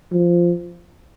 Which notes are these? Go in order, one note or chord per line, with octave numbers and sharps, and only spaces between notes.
F3